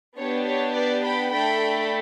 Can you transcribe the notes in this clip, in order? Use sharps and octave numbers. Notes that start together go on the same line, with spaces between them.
B3 D4 G4 C#5
C#5
B4 D5
G5 B5
A3 D4 A4 G5 B5